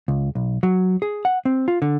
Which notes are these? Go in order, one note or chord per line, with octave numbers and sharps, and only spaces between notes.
C#2
B1
F#3
G#4
F#5
C4
F4
D3